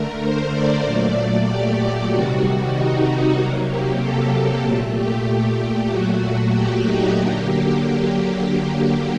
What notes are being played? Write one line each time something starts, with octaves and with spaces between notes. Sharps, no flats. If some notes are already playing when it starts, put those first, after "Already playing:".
Already playing: D3 A3 A#4
C5
D5
A#2 F#3 A3 D5
G4
G4
C3 D#3 G3 F#4
D#4
F#4
C3 F#3 A#3
G4
A4
A#2 A3
G4
A#2 F#3 A3 F#4
G4
D#4
D3 F#3 A#3 G4